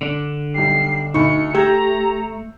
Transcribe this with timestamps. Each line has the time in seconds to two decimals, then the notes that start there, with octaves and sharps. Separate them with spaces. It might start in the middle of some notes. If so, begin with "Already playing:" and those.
0.01 D3 D4
0.54 B1 G3 C7
1.14 D2 D#4 B5 C#6 C#7
1.55 A3 G4 A#5 E6 G6 G#6